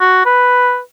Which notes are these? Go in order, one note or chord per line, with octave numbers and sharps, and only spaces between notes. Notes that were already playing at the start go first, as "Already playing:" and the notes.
F#4
B4